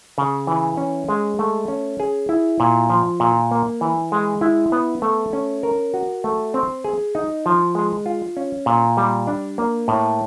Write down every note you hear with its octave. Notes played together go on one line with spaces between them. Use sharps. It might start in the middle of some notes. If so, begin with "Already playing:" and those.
C#3
E3
C#4
G#3
A3
C#4
G#4
E4
A#2
F3
A#2
A#3
E3
G#3
E4
B3
A3
C#4
A#4
F#4
A3
C4
G#4
D#4
F3
G#3
F4
C#4
A#2
G3
D4
A#3
A2